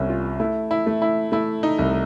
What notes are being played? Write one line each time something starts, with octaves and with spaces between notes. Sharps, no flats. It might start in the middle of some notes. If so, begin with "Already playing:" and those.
Already playing: C2 B3 C#4
F4
A3 E4
E4
A3
E4
A3 E4
D#4
C2